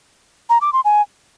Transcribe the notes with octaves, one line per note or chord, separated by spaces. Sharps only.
A#5
D6
C6
G#5